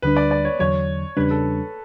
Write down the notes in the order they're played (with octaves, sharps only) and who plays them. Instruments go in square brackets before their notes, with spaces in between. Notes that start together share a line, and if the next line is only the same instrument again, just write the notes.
[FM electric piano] D2 D3 G3 D4 [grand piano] B4
[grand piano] D5
D5
C#5
[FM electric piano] E2 D3 F#3 [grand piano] C#5
[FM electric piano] E2 C#3 G3 D4 [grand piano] B4
[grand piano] A4